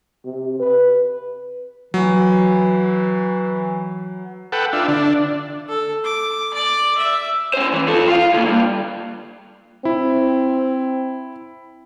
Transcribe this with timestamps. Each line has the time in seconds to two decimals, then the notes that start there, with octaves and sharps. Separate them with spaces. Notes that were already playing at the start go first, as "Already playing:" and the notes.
0.25 C3
0.60 B4
1.94 E3 F#3
4.52 A4 B4 F#5 G5
4.73 D4 F4 E5
4.88 D3 D4
5.69 A4
6.05 D6
6.54 D5
6.97 E5
7.54 C#4 C5
7.73 E3
7.88 F4 A4
8.08 F4 F5
8.33 D3 A#3
8.47 G2
9.85 C4 E4